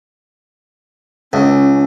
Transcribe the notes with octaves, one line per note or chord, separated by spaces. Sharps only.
C#2 C#4